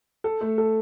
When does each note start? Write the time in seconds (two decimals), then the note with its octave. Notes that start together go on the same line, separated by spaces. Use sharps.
0.24 A4
0.41 A3
0.58 A4